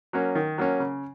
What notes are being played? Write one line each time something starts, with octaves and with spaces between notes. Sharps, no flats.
F#3 A#3 C#4
D#3
F#3 A#3 C#4
C#3